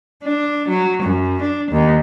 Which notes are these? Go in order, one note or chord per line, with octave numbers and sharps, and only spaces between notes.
D4
F#3
F#2
D4
D#2